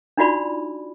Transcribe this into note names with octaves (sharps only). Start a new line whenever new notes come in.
D4 D#4 F4 F#4 D5 B5